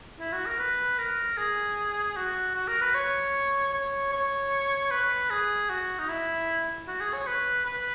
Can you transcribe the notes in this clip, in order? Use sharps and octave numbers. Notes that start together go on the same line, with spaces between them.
E4
F#4
A#4
B4
A#4
G#4
F#4
F#4
A#4
B4
C#5
C#5
C#5
B4
G#4
F#4
D#4
E4
F#4
G#4
C#5
B4
B4